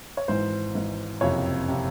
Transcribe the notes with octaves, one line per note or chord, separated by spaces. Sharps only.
C#5
G#1 G#2 E3 C5
G#1 G#2 E3
F#1 F2 C3 C#5
C3